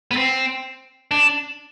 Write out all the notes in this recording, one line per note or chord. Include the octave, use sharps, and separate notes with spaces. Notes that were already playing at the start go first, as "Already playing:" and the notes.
B3
C4
D4